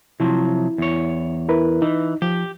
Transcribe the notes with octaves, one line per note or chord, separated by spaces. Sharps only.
C3 F3 F#3 E4
E2 C#5
E4 A#4 B4
E3 D#4
F3 G4